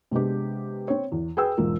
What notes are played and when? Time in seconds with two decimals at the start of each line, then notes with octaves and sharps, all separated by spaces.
0.11 C3 G#3 B3 D4 G4
0.88 C4 C#5
1.12 E2
1.37 G#4 B4 G5 E6
1.57 E1 G#2 F4 A#4